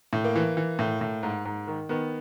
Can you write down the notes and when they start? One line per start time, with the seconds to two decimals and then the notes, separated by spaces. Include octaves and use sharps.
0.13 A2
0.24 A#3
0.36 E3
0.57 E3
0.79 A2
1.01 A2
1.23 G#2
1.45 G#2
1.67 D#3
1.89 D#3 B3